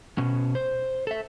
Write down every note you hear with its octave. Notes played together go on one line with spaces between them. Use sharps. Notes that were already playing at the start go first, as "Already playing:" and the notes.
B2 C#4
C5
A4 E5